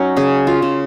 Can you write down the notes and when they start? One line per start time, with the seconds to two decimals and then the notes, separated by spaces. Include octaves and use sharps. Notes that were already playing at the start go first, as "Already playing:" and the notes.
Already playing: F#3 C#4 D#4
0.17 C#3 G#4
0.47 F4
0.62 C#3